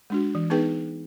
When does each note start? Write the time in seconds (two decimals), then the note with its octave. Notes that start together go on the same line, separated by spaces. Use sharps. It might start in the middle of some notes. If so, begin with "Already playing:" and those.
0.10 G#3 D4 F#4
0.35 E3
0.50 B3 D#4 G#4 B4 G5